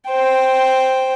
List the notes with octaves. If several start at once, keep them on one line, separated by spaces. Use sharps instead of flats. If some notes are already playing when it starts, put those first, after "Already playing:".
C5 G5